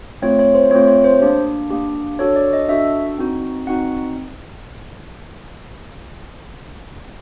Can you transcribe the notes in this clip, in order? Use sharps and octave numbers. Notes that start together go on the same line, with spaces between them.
A3 C4 F4 C#5
C#5
C5
A3 C4 F4 C#5
C#5
C5
A#3 D4 G4
A#3 D4 G4
D4 F#4 A4 C#5
D5
D#5
D4 F#4 A4 E5
C4 D#4 F#4
C4 D#4 F#4 F#5